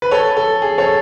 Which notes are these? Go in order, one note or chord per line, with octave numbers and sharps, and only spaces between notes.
B4
A4 C#5
A4
G#4
A4 C#5